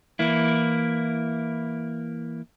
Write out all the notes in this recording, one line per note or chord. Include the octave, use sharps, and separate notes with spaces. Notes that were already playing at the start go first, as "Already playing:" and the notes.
E3 A#3 E4